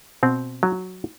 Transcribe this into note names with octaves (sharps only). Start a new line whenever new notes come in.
B2 C4
F#3